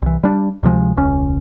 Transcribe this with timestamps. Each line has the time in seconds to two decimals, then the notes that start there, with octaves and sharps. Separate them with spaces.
0.02 C2 E3
0.23 G3 D4
0.63 D2 C3 F3 G#3
0.96 E1 C#2 C#4